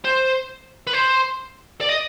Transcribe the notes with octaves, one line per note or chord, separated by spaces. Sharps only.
C5
B4
C5
D5
D#5